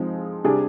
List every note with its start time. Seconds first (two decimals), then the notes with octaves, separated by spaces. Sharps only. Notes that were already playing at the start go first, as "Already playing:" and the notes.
Already playing: F3 G#3 C4 D#4
0.44 C3 G3 D4 G#4